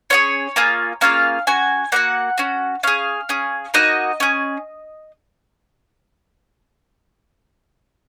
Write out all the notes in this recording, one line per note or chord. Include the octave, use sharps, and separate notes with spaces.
C#4 F4 G#4 C#5
A#3 F4 G#4
A#3 C#4 F4 G#4 F5
C#4 F#4 G#5
A#3 D#4 F#4 F#5
C#4 F#4
C#4 G#4 F5
C#4 G#4
A#3 D#4 F#4 D#5
C#4 G#4